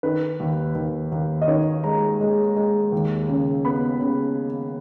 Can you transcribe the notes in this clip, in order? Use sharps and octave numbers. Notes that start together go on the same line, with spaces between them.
D#3 B4
D#2
D#2
D#2
D#5
D#3 C#5
G#3 A#5
G#3
G#3
D#2
C#3
B3 B5
C#3